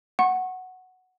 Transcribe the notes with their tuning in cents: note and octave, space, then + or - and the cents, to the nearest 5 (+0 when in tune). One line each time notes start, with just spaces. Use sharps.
F#5 +0 C#6 -30